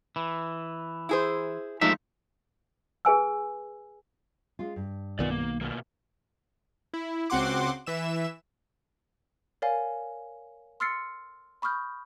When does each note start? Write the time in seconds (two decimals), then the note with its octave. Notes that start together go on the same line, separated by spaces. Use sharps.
0.16 E3
1.09 E4 G#4 C5
1.81 G2 F3 G#3 A3 D#4 E5
3.05 G#4 B4 G#5 E6
4.59 G#3 C#4 F4
4.76 G2
5.19 B1 D#3 B3 F4 D5
5.31 A#3
5.61 B2 A3 A#3
6.94 E4
7.30 C#2 C4 F#4 F#5 C6 D6
7.87 E3 E5 E7
9.62 A#4 C#5 D5 F5 G#5
10.80 C6 E6 F6 A6 C7 C#7
11.62 B5 C#6 D#6 F6 G6